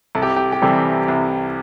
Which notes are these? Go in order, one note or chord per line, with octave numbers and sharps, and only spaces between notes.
C2 A4
G4
G4
G4
C3 E3 G3 A4
C2